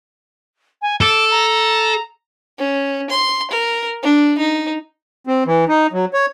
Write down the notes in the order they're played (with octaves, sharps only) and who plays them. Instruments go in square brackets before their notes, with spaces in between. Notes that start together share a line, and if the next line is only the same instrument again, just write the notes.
[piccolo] G#5
[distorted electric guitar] A4 [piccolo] D6
[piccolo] A#5
[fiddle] C#4
C6
A#4
D4
D#4
[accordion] C4
E3
D#4
F#3
C#5